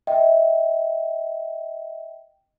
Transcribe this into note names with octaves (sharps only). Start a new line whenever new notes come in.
D#5 E5 G5